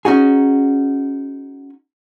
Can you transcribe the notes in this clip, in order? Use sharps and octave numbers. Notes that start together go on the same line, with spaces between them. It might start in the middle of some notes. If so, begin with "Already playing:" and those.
C#4 D#4 F#4 G#4